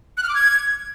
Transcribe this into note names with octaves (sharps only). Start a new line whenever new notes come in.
F#6
F6
D6
G#6